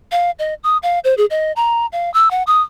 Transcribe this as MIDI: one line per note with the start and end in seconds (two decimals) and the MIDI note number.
0.12 0.31 77
0.39 0.54 75
0.64 0.78 87
0.83 0.99 77
1.04 1.14 72
1.18 1.26 68
1.30 1.52 75
1.56 1.86 82
1.92 2.12 77
2.14 2.31 88
2.31 2.43 78
2.47 2.62 87